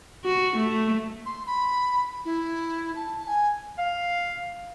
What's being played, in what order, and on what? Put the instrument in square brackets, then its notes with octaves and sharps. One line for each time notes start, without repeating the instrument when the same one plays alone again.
[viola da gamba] F#4
A3
[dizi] C6
B5
E4
A5
G#5
[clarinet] F5